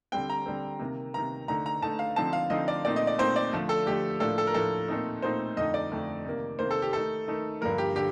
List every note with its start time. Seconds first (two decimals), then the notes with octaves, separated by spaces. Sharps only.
0.12 D3 G3 C4 G5
0.30 A#5
0.46 D3 G3 C4
0.79 C3 D#3 A#3
1.14 C3 D#3 A#3 A#5
1.48 D3 A3 D#4 A#5
1.66 A#5
1.82 D3 A3 D#4 A5
1.99 F5
2.16 D3 F3 C4 D#4 A5
2.33 F5
2.50 D3 F3 C4 D#4 D#5
2.68 D5
2.85 A#2 A3 C4 D#4 D5
2.96 D#5
3.07 D5
3.18 A#2 A3 C4 D#4 C5
3.36 D5
3.53 D3 F3 A3
3.69 A4
3.86 D3 F3 A3 G4
4.20 A2 F3 A#3 D4 A4
4.38 A4
4.47 A#4
4.54 A2 F3 A#3 D4 A4
4.88 A#2 A3 C4 D#4
5.22 A#2 A3 C4 D#4 C5
5.56 F2 D3 A3 D#4 D#5
5.74 D5
5.91 F2 D3 A3 D#4
6.25 C3 D#3 A#3
6.59 C3 D#3 A#3 C5
6.71 A4
6.82 G4
6.93 D#3 A3 D#4 A4
7.28 D#3 A3 D#4
7.61 G2 D3 F3 A#3 A#4
7.78 G4
7.96 D3 G4